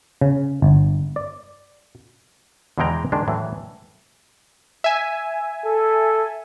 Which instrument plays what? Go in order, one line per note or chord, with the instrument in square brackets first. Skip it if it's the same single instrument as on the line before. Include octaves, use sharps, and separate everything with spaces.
[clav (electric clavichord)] C#3
G1
D5
E2 B2 E3 G#3 G5 A#5
D#3 G#3 D4
A2 E3 F#3
[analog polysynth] E5 G#5
[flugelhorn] A4